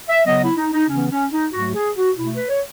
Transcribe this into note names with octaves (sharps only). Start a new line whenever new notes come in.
E5
C#3 F#3 B3 D#5
E4
D#4
D#4
C#3 E3 B3 C#4
C#4
D#4
G#2 F#3 A3 F#4
G#4
F#4
B2 A3 E4
B4
C#5